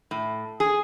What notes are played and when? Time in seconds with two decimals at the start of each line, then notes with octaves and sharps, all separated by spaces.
0.11 A2
0.60 G#4